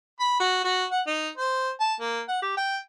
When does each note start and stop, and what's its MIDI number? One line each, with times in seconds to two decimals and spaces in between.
0.20 0.38 83
0.40 0.60 66
0.64 0.85 66
0.91 1.01 78
1.07 1.29 63
1.37 1.70 72
1.80 1.95 81
2.00 2.21 58
2.28 2.39 78
2.42 2.52 67
2.57 2.77 79